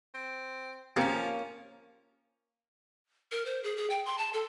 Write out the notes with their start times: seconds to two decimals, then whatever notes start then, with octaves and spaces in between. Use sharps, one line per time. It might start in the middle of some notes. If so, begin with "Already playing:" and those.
0.15 C4
0.96 F3 A#3 C4 C#4 G4
3.32 A#4
3.46 C5
3.64 G#4
3.77 G#4
3.90 G5
4.06 C6
4.18 A5
4.33 A4